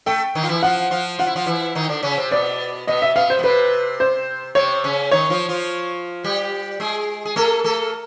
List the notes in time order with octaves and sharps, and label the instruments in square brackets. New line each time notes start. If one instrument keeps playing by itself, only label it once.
[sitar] A3 A4 [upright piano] G5
[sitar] D#3 D#4
F4
E3 E4
[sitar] F3 F4 [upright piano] F#5
[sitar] F3 F4
[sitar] F4 [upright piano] F#5
[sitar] E4
F3 F4
E3 E4
D#3 D#4
D3 D4
C#3 C#4
C3 C4
[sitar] B2 B3 [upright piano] D5
[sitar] B2 B3 [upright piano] D#5
[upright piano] E5
[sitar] B2 B3 [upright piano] F5
[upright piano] C5
[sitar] B3
[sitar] C3 C4 [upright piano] B4
[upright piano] C5
[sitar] C3 C4 [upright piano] C#5
[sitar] C#3 C#4
[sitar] D#3 D#4 [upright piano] C#5
[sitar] F3 F4
F3 F4
G3 G4
G#3 G#4
G#4
[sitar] A3 A4 [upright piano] A#4
[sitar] A3 A4